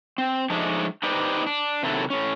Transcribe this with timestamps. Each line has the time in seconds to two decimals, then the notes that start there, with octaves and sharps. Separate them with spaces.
0.18 C4
0.50 F3 G#3 A3 D4 D#4
1.03 D#4 G4 B4 C5 D5
1.47 D4
1.83 C3 D#3 F#3 E4 A4
2.10 A2 C#4